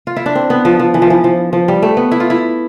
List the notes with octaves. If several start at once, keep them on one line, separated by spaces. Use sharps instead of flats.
F4
E4
D4
C4
B3
F3
F3
E3
F3
E3
F3
F3
G3
A3
B3
E4
F4
E4